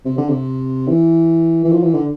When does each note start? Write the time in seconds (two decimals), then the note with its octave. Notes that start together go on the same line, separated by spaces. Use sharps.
0.05 C3
0.17 D3
0.29 C3
0.88 E3
1.64 E3
1.72 F3
1.83 E3
1.94 D3